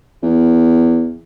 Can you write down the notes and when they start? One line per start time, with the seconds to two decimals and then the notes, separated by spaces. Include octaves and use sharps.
0.23 E2